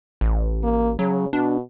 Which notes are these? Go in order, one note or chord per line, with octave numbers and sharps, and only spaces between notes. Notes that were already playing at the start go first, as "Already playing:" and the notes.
A1
A#3
C#3 F#3
B2 D4